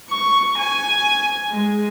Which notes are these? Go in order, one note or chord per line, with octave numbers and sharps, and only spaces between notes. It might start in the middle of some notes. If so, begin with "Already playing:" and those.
C#6
G#5
G#3